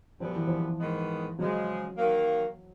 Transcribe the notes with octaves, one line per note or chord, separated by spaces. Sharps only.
F#2 D3 F3 G3 B3
E3
F3
G#2 D#3 G#3 B3
C#3 F3 F#3 G#3
D#3 F#3 A#3